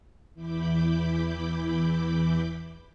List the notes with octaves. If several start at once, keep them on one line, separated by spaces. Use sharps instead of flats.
E2 E3 E4 B5 D6 G6